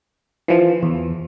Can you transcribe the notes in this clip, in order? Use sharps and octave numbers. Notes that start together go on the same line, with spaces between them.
E3 F3
E2